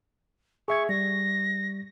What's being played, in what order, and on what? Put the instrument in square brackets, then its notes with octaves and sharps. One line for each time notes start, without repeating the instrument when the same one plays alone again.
[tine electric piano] G#4 E5 G#6 [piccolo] C#6
[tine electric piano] G3 [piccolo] A#6